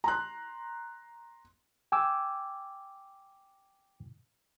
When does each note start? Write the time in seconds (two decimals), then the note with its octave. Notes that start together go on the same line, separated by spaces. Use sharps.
0.04 A#5 C6 F#6
1.92 G5 G#5 D6 E6